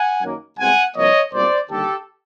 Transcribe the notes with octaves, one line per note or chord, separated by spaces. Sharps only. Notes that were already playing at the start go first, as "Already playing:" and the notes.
Already playing: F#5 G#5
F#2 D#3 F#3 A#3
C2 B2 G#3 C4 F#5 G#5
C2 C3 F3 A#3 C#5 D#5
B1 A#2 G3 C4 C5 D5
D#2 D3 G3 G4 A4